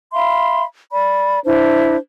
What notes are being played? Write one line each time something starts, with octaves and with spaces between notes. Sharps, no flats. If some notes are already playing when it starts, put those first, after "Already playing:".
E5 F5 B5 C6
D5 B5
D4 E4 C5